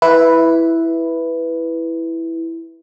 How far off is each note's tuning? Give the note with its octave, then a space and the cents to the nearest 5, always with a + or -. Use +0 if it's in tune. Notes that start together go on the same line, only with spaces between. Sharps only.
E4 +0 B4 +0